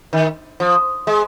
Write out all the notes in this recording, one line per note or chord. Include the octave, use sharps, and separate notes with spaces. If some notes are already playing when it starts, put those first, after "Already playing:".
D#3
F3
G#3